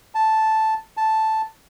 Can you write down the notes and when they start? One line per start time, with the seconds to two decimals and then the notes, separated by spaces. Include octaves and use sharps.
0.15 A5
0.97 A5